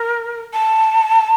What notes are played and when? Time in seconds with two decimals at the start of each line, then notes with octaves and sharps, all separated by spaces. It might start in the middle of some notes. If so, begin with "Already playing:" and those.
Already playing: A#4
0.53 A5